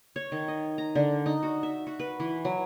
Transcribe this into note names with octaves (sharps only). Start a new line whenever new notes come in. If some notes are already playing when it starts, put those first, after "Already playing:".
C#5
D#3
D#5
A#5
D3
D#4
F#4
E5
F#4
B4
E3
F#3